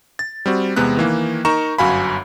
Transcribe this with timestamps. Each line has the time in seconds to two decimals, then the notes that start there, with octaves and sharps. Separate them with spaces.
0.19 A6
0.46 G3 C4 F#4
0.76 E2 C3 G#3 B3 F#6
0.97 D#3 E3 A#3
1.45 D#4 A#4 A#5 C#6 E7
1.78 G1 F#2 F#4 F5 G#5 B5